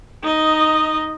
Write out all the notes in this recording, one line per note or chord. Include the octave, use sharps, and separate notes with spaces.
D#4 D#5